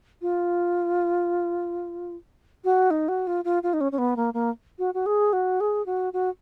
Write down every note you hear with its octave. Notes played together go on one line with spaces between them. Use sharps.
F4
F#4
D#4
F#4
F4
F4
F4
D#4
C#4
C#4
B3
A#3
A#3
F#4
F#4
G#4
F#4
G#4
F#4
F#4